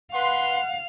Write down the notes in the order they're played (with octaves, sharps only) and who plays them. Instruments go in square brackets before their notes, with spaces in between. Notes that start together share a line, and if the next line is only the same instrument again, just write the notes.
[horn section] B4 C6 [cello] F5 [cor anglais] F#5